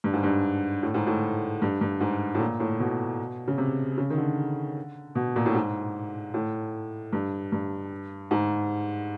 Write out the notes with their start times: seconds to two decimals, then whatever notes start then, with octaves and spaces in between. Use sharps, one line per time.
0.04 G2
0.14 G#2
0.23 G2
0.83 A2
0.94 G#2
1.07 A2
1.62 G2
1.81 G2
2.01 G#2
2.35 A2
2.40 A#2
2.60 A2
2.80 B2
3.48 C#3
3.58 C3
3.98 C#3
4.10 D#3
4.18 D3
5.15 B2
5.36 A#2
5.46 A2
5.55 G#2
6.34 A2
7.13 G2
7.52 G2
8.31 G#2